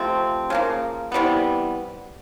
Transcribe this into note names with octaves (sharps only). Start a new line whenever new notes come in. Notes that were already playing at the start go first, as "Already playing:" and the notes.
Already playing: C3 F3 A3 C4
C#3 F3 A#3
C3 E3 G3 B3